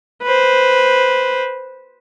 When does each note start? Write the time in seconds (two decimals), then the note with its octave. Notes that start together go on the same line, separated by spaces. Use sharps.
0.23 B4 C5